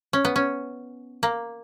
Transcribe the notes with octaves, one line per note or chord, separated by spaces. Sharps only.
C#4
B3
C#4
A#3